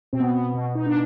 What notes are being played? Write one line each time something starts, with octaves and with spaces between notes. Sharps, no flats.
B2 C4
B3
B3
B2
D#4
D4